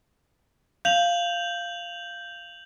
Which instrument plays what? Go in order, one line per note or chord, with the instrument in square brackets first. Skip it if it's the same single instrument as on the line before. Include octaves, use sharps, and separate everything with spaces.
[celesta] F5 [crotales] G6 F7 F#7